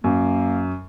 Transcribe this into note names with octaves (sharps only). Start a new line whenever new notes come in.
F#2 A#3